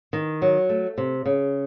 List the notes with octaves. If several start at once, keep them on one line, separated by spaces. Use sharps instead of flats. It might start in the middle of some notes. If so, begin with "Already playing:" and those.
D#3
F#3
A3
C3
C#3